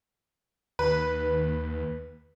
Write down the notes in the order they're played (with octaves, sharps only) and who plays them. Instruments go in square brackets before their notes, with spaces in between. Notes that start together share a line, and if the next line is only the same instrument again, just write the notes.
[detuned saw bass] D#2 [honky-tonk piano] B4